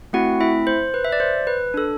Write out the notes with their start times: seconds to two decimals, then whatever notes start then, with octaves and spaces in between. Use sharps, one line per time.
0.13 A3 C4 E4 F#4 F#5
0.41 E4 E5
0.67 C5
0.94 B4
1.05 E5
1.12 D5
1.20 C5
1.47 B4
1.74 D4 A4